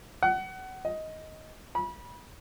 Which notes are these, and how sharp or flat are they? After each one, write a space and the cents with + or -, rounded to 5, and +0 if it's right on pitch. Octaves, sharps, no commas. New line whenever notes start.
F#5 +25
D#5 +15
B5 -30